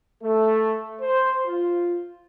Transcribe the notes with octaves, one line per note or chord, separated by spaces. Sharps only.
A3
C5
F4